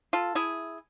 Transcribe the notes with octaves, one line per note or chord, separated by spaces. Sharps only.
F4 A4
E4 G#4